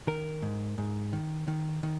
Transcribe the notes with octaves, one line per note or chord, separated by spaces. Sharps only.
D#3 A#4
G#2
G#2
D#3
D#3
D#3